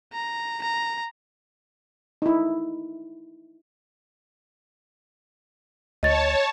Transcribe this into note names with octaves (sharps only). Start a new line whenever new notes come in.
A#5
A#5
D#4 E4
D2 C#5 D#5 A5 A6